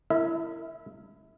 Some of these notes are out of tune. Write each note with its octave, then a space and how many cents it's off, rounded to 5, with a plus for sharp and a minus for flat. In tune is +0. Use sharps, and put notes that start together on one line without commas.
E4 +15 A#4 -25 E5 -30